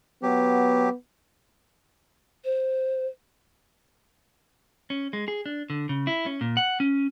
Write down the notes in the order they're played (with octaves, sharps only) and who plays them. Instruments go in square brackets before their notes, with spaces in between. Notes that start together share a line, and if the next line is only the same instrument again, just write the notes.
[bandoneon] F#3 G4 [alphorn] B3
[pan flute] C5
[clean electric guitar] C#4
G#3
G#4
D4
D3
C#3
E4
C#4
A#2
F#5
C#4